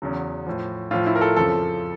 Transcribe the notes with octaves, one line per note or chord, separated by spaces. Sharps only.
E2 C#3 F#3
A2 F3
A2 F3 F4
E4
A#4
A4
F2 C#3 F3 A4